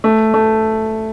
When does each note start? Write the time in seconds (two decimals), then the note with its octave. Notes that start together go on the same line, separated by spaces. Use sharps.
0.04 A3
0.34 A3